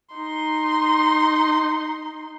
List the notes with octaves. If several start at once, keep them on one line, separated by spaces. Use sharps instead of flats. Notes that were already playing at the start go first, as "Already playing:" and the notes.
D#4 C6